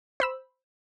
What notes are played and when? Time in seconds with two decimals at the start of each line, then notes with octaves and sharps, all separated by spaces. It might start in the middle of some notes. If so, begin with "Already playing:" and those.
0.20 C5 B5 E6